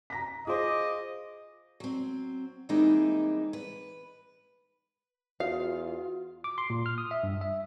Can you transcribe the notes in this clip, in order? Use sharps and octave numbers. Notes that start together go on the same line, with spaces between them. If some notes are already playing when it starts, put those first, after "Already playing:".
A#5 A#6 B6
F4 G#4 C5 D#5 D6
F#3 C4
E3 G3 G#3 A#3 C4 D#4
B4
E2 F4 F#4 F5
D6
C6
A#2
F6
D#6
E5
G2
E5